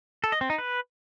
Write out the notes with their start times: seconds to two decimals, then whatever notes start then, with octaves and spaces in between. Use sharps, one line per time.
0.24 A4
0.32 D#5
0.41 C4
0.50 D#4
0.58 B4